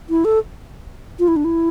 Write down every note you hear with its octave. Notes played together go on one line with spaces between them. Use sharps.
E4
A4
F4
E4
D4
E4